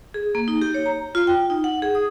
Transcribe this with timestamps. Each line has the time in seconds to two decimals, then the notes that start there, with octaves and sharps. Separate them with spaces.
0.14 G#4
0.35 A#3
0.48 D#4
0.62 G4
0.74 C#5
0.86 A#5
1.15 F4
1.27 G5
1.50 D#4
1.64 F#5
1.82 G#4
1.95 D#6